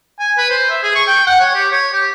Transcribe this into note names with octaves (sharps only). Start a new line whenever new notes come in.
G#5
B4
C5
E5
G#4
C#6
G5
F#5
C#5
G4
C#5
G4